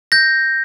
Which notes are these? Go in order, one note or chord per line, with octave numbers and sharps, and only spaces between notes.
G6 A#6